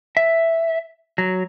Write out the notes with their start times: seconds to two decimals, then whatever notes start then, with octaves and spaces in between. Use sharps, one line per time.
0.17 E5
1.18 F#3